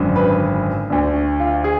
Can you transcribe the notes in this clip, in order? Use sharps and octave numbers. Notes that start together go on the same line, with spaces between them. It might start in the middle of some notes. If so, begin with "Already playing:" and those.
Already playing: G#1 F#2 D3
B4
D2 D3
F4
G#4